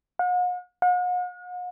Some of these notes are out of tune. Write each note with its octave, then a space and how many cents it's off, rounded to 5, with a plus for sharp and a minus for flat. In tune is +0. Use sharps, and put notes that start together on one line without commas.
F#5 -45
F#5 -45